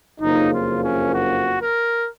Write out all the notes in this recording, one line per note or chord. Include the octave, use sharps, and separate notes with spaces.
F#1 F2 C#3 F3 A#3 D#4
F4
C#4
F#4
A#4